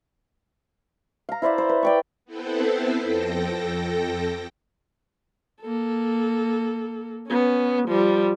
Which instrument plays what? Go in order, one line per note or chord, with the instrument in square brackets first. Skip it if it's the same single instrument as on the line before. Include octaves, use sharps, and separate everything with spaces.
[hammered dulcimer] F5 A#5
E4 C5 D5 E5
C5
B4
D5 G5 C#6
[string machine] B3 C4 E4 A4 B4 C5
F2 A4 G5 A#6
[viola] A#3 A4
B3 C#4
F3 G3